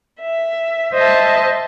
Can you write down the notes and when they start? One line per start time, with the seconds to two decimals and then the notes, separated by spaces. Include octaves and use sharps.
0.21 E5
0.94 C5 D#5 E5 A5